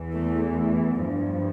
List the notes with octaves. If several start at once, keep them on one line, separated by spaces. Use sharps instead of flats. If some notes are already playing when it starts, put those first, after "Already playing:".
Already playing: E2 E3
A3
G2 F3